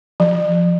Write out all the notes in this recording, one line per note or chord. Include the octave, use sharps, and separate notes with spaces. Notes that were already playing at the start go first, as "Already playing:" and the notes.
F3